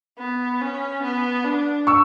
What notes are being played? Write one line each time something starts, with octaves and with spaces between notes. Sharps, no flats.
B3
C#4
B3
D4
C#6 E6